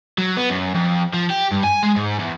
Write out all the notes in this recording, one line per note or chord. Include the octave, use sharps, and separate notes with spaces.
F#3
B3
F#2
F2
F3
G4
G2
G#5
G#3
G#2
E2